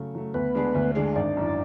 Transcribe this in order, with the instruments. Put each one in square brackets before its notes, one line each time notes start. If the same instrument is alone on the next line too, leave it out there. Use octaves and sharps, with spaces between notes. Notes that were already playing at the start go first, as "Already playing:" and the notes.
Already playing: [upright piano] C#3 F#3 A3
F#3 A3
[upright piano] D2 [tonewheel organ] B3 B4
[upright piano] D3 G#3 D4 G#4
D2
D3 G#3 D4 G#4
[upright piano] G#1 [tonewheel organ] D4 D5
[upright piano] F#2 E3